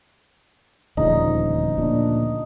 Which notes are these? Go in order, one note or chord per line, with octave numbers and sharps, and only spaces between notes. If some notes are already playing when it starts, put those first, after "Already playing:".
D#1 D2 C#3 F3 D#4
A#2 D4